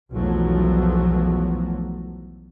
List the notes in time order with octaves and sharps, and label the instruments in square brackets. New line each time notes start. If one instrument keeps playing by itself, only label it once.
[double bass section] B1 E2 F3 F#3 A3